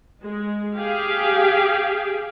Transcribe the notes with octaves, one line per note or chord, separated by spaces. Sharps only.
G#3
G4 G#4 F5 G5